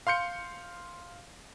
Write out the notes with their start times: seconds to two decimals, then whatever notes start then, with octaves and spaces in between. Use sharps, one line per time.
0.07 F5 C6 G6 C#7